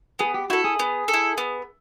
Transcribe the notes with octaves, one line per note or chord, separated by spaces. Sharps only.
B3 G#4
G4
E4 F#4 A4
G#4
B3
A4
E4
B3